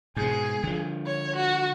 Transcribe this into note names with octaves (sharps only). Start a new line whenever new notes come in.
G#2 B2 G#4
D3 F3
C#5
F#4